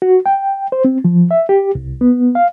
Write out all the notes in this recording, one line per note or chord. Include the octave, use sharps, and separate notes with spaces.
F#4
G5
C5
C4
F3
E5
G4
C2
B3
F5